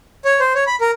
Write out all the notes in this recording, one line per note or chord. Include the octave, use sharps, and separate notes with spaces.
C#5
C5
C#5
B5
A#4